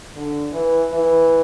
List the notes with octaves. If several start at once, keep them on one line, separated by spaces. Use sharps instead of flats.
D3
E3
E3